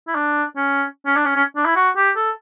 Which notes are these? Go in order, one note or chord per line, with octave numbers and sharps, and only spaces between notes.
E4
D4
C#4
C#4
D4
C#4
C#4
D4
E4
F#4
G4
A4